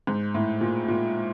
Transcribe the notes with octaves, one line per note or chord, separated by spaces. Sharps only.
G#2
A2
A#2
A#2